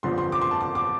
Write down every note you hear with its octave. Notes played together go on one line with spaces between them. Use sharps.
G1 F2 D3 F3 C6
C6
D6
C6
A5
D6
D6